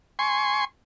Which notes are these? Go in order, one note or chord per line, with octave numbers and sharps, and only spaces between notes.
G#5 C6 C#6